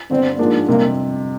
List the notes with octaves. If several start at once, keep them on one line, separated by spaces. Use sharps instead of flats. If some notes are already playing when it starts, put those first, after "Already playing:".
G1 G2 D3 C4
G#2 F3 G#3 A#3 D4
F2 C3 G3 A#3